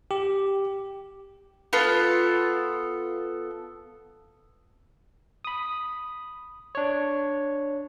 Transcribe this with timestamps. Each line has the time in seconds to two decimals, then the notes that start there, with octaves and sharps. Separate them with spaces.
0.11 G4
1.73 B3 F4 A4
5.45 B5 D#6
6.75 D4 C#5